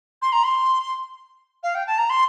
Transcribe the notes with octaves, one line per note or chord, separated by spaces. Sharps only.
C6
A#5
C6
F5
G5
A5
A#5
C6